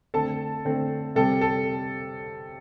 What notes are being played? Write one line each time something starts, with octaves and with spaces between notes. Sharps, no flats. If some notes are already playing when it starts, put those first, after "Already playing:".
D3 A3 C4 A4 A5
D3 A3 C4
C3 G3 C4 A4
A4